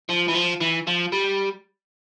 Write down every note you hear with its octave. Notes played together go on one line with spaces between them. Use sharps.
F3
E3
F3
E3
F3
G3